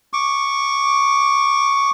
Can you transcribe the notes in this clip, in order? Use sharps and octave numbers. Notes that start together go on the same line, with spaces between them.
C#6 D6